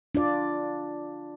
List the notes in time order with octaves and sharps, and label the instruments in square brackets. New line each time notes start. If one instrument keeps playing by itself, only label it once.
[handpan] D4 F4 D5